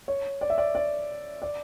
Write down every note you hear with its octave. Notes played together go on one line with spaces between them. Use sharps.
C#5
D5
E5
D5
D5
D5